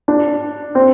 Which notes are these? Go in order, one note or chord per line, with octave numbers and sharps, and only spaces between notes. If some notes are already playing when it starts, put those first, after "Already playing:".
D4
C4